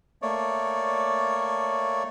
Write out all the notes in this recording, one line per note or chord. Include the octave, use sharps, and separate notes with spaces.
A3 A#3 C#5 D5